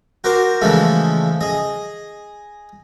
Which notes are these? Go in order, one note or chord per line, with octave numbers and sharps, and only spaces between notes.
F#4 A#4 C5 D6
C#3 E3 F3 G#3 A3
G#4 D#5